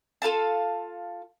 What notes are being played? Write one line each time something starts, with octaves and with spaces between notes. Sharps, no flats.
F4 A4 F5 A5